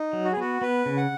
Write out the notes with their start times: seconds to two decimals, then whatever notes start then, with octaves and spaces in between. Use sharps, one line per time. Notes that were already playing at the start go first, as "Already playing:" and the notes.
Already playing: D#4
0.13 F#3
0.25 F#4
0.32 G#4
0.37 B3 F#4
0.61 B3 B4
0.86 C#3
0.97 F#5